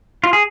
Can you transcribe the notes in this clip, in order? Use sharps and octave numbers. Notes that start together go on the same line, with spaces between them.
F4
G#4